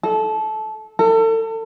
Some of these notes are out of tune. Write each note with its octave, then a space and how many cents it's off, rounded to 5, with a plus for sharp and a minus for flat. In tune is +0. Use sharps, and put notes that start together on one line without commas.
A4 -20
A4 +35